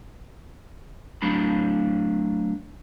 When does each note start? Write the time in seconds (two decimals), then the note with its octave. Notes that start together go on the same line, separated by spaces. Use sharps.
1.22 F#3 A3 D4 B5